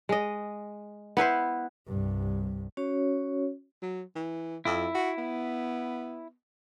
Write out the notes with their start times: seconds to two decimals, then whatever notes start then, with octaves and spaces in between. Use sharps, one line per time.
0.09 G#3 D#5
1.17 B3 E4 B4 C5
1.87 C2 G2
2.77 C#4 F#4 C#5
3.82 F#3
4.15 E3
4.65 F2 E4
4.95 F#4
5.18 B3